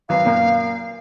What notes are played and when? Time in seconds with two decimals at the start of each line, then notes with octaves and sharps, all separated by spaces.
0.09 G#1 F#3 B4 F5
0.25 F#2 A#2 A#3